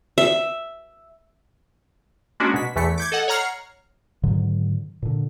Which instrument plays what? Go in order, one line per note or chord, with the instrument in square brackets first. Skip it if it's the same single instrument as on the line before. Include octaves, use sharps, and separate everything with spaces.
[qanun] E5
[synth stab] G#3 A#3 C#4 D4 F#4
B2 B6
E2 E3 A3 B6 C#7
D6 G6 G#6
A4 D#5 F#5
C#5 F#5 A#5 F6 C7
[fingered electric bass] G#2 D3 D#3 F#3
A#2 D3